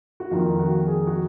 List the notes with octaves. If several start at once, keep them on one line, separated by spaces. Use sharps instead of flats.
F#4
F2 D#3 A#3 F4
F#4
G#4
F#4